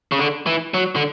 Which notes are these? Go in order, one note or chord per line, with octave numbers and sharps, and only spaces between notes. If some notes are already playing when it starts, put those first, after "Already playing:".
C#3
D3
E3
F#3
D3